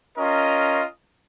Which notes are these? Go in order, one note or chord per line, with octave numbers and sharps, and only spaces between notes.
C#4 F4 A#4 D#5